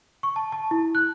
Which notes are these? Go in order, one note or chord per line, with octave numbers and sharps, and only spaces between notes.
C#6
A5
A5
E4
F#6